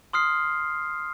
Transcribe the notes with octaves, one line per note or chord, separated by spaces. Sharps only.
C6 D#6 F6 C7